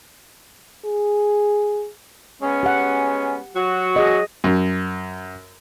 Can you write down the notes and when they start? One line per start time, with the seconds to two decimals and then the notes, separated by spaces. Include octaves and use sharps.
0.85 G#4
2.42 G#3 B3 C#4
2.63 G4 F#5
3.56 F#3 F#4
3.96 G#4 D#5
4.44 F#2